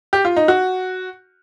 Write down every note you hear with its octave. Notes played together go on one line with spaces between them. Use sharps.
G4
F4
D#4
F#4